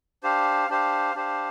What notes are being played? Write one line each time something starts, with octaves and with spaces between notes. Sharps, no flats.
D4 G4 C5 F5
D4 G4 C5 F5
D4 G4 C5 F5